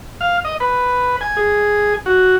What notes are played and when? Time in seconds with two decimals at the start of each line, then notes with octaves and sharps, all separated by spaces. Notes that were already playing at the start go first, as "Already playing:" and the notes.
0.21 F5
0.45 D#5
0.60 B4
1.21 G#5
1.37 G#4
2.06 F#4